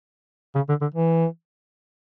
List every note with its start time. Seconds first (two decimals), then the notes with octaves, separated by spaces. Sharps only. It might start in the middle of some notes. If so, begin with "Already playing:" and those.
0.55 C#3
0.69 D3
0.81 D3
0.94 E3